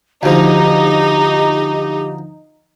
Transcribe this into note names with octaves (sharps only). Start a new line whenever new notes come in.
D2 F3 D#4 G4